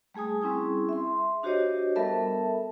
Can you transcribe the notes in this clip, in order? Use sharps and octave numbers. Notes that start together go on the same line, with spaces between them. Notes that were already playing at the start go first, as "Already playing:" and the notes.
G3 A3 G#4 G#5 D#6
G3 C4 C#4 E4 G#4
E5 C6
D4 F#4 G4 C5 C#5 D#5
G3 B3 A4 A#4 E5 A5